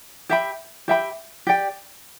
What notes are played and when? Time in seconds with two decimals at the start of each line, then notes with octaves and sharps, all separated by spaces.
0.29 G4 E5 G5 B5
0.88 G4 E5 G5 B5
1.47 G4 D5 G5